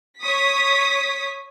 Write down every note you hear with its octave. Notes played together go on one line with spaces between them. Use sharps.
C#5 D#6 B6